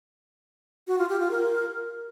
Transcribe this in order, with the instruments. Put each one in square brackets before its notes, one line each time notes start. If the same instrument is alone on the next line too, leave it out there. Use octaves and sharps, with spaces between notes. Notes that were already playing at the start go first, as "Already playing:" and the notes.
[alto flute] F#4
F4
G4
F4
A#4